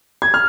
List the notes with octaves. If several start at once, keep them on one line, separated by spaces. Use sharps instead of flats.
G#6
F6